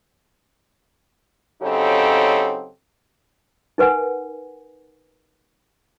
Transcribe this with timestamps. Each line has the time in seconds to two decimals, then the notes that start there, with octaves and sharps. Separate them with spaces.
1.63 C#3 F#3 C4 D#4 G4 A4
3.78 D#4 A#4 B4 F#5 G#5